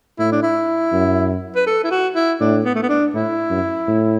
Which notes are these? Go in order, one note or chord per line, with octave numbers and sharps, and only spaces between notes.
A2 E4
D4
E4
F#2
B4
A4
E4
F#4
E4
A2 D4
B3
A3
B3
D4
A2 E4
F#2
A2